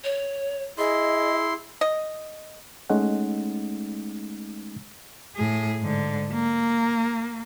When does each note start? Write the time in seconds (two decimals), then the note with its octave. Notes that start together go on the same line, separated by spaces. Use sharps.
0.04 C#5
0.78 E4 G#4 D#5 C6
1.81 D#5
2.90 G#3 A3 C#4 D#4 F#5
5.36 A2 G#4
5.80 G#2 D3
6.32 A#3